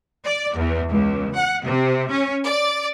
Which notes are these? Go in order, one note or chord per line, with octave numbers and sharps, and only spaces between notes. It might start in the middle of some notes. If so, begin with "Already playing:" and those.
D5
E2
C#2
F#5
C3
C#4
D5